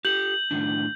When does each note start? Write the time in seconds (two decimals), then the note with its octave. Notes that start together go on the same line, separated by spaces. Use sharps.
0.05 G4 A4 G6 F#7
0.51 A2 D#3 D4